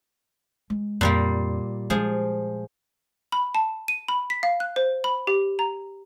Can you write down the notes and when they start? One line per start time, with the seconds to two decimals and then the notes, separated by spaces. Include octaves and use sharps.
0.70 G#3
1.01 F2 A#2 G3 A#3
1.90 F3 G#3 G#4
3.32 B5
3.55 A5
3.88 D#7
4.08 B5
4.30 B6
4.43 F5
4.60 F#6
4.76 C5
5.04 B5
5.27 G4
5.59 A#5